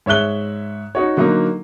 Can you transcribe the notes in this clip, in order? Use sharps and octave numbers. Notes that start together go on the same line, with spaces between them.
G#2 C#5 E5 F#6 G7
D#4 F#4 C#5
D3 F#3 A#3 D#4